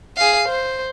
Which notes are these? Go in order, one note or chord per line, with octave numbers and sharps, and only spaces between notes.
G#4 F5
C5